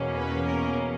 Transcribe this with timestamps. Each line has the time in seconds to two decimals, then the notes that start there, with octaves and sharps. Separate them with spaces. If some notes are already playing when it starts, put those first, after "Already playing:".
Already playing: E2 B2 A#3 C#4
0.15 B4
0.46 A#4